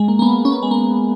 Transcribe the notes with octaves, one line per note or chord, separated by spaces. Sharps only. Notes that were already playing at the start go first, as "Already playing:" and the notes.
Already playing: G#3
A#3
A#3
B3
C#4
B3
G#3
A#3